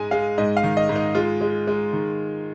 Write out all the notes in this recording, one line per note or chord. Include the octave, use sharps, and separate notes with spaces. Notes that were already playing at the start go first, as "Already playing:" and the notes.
Already playing: G#2 G#3 G#5
G#3 F5
G#2 D#5
F5
D#3
D#5
G#2
D#4
G#3 F4
G#3
G#3
D#3